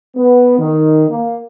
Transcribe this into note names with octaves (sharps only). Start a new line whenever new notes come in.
B3
D#3
A#3